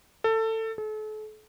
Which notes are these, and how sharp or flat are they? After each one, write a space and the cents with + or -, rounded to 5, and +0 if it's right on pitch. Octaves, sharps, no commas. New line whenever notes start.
A4 +20
A4 -40